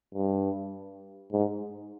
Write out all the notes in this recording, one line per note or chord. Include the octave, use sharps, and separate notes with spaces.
G2
G#2